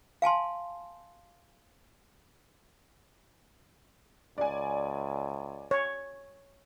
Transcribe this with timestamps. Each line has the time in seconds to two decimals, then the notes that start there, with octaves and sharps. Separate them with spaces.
0.22 F5 G#5 A5 C6
4.38 C#2 D5 G#5
5.71 C#5